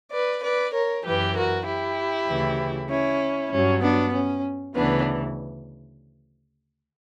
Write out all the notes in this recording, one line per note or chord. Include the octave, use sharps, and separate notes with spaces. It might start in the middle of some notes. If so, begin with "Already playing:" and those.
B4 D5
B4 D5
A#4 C#5
F#2 E3 G4 B4
F#4 A#4
E4 G4
D2 C#3 E3
C#4 E4
G2 F#3 C#4
B3 D4
C#4
D2 C#3 E3 B3 D4